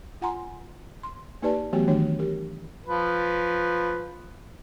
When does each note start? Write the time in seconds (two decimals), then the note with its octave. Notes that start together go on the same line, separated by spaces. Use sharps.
0.22 F4 F#5 G#5 A#5 C6
1.03 C6
1.42 A#3 D#4 G4 B4 D5 A5
1.73 E3 F#3 A3 B3 F#4 G4
1.88 D#3 E3 A3 D4 F#4 C#5
2.19 G4 A#4
2.86 F3 B4